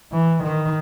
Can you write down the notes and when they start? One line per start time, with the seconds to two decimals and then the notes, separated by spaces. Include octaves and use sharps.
0.12 E3
0.43 D#3